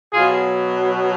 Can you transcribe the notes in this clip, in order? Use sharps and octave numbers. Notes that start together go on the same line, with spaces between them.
B2 F#3 F4 G#4